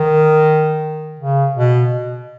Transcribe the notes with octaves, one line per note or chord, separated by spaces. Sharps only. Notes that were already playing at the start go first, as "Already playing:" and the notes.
Already playing: D#3
C#3
B2